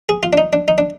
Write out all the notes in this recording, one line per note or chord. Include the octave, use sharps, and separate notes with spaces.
G#4
F4
D4
D#4
D4
D#4
D4